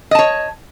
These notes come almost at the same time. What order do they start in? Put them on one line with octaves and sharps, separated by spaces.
D#5 A5 C#5